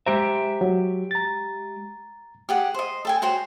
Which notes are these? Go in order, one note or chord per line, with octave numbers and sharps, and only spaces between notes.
G#3 G4 C5 E5 A#5
F#3
A#5 A6
G4 G#4 F#5
C5 D#5
A4 G5 G#5
F#4 C5 C#5 G5